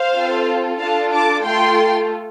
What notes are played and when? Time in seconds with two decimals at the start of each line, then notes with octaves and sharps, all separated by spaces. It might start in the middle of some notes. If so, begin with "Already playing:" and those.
Already playing: C5 F5
0.14 C4 F4 A4
0.79 D4 F4 A4 F5 A5
1.11 A5 D6
1.44 A3 F4 A4 G5 C6